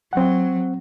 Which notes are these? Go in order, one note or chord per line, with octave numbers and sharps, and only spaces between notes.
F#3 C4 F#5